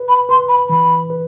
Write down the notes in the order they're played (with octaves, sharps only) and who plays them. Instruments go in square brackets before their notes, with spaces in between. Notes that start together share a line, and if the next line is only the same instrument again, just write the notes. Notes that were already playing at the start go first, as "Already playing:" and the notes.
Already playing: [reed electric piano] B4
[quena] B5
[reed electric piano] B4 [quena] C6
[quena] B5
[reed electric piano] E3 [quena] B5
[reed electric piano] B4